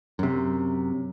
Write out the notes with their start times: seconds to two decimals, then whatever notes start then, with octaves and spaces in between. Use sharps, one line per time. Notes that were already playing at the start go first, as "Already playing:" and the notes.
0.19 F#2 C3